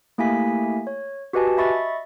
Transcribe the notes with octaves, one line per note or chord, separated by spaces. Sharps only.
A3 A#3 E4 G4 G#5 B6
C#5
F#4 G4 B4 D#5 G#5 A5
D#5 E5 B5 C#6 A6